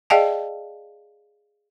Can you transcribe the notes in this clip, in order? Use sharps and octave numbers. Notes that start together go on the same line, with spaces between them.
G#4 D5 D#5 F5 G5 A5